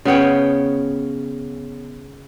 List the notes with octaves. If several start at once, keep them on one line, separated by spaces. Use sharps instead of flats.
C#3 B3 C#5 G5